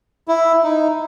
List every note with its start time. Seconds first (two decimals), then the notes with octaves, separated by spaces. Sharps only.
0.28 E4
0.63 D#4